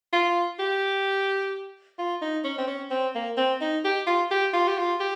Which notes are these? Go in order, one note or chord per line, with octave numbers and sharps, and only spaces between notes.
F4
G4
F4
D#4
C#4
C4
C#4
C4
A#3
C4
D#4
G4
F4
G4
F4
G4
F4
G4